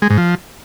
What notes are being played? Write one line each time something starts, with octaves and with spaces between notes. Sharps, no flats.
G#3
G#2
F3